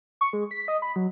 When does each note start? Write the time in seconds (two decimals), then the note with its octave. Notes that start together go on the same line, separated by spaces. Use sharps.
0.21 C#6
0.33 G#3
0.51 B6
0.68 D#5
0.82 B5
0.96 F#3